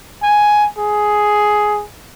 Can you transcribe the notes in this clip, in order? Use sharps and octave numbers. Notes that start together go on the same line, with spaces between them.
G#5
G#4